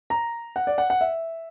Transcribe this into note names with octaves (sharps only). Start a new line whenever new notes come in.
A#5
F#5
D5
F#5
F#5
E5